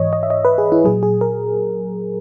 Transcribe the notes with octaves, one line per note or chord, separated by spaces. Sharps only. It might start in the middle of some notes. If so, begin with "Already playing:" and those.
Already playing: G#2 E3 C#5 D#5
D#5
E5
D#5
B4
G#4
E4
A#2 F#3 G#4
G#4
A#4